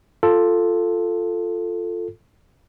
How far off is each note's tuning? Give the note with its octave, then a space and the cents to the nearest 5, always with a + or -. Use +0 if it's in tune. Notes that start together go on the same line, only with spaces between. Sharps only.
F4 +0 A4 +5